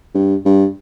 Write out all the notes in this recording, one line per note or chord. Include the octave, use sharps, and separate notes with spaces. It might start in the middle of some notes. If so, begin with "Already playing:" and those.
G2
G2